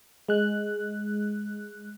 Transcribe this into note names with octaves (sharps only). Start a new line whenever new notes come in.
G#3 F#6